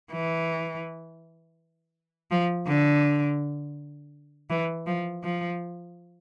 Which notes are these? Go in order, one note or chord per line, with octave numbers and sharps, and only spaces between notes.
E3
F3
D3
E3
F3
F3